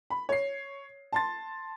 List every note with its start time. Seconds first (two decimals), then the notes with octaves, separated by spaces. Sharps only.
0.10 B5
0.29 C#5 C7
1.13 A5 C6 A6